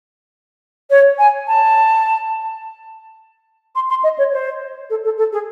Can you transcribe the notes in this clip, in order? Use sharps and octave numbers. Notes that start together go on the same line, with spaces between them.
C#5
G#5
A5
C6
C6
D#5
C#5
C5
A4
A4
A4
G#4